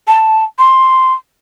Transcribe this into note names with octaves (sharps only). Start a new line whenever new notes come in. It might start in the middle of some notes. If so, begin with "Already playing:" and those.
A5
C6